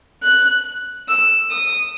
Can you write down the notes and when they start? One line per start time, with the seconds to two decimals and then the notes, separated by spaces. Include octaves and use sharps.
0.23 F#6
1.08 E6
1.52 D#6